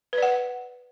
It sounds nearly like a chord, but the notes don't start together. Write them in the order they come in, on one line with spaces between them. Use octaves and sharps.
B4 D5 F#5